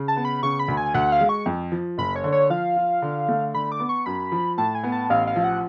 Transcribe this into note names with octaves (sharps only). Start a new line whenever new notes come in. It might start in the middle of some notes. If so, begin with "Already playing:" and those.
Already playing: C#3
A5
B3
B5
C#3 C#6
B5
D2
G#5
D2 F#5
F5
G#3
C#6
F2
F3
F#1 B5
C#5
D3
C#5
F3 F5
F4
D3
A3
D3 B5
D6
B3
C#6
F#2 B5
F3
A2 A5
G#5
B3
A5
A1 F5
F5
F3
F#5